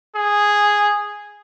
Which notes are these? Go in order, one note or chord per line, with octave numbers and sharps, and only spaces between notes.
G#4